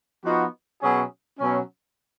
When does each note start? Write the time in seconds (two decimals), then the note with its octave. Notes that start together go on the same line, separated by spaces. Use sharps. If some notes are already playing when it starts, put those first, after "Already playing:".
0.25 F3 B3 D#4 F#4
0.82 B2 F#3 C#4 G#4
1.39 B2 F#3 C#4